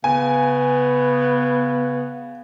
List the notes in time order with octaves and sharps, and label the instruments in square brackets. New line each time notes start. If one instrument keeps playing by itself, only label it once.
[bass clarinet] C#3 [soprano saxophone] B3 [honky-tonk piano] G#5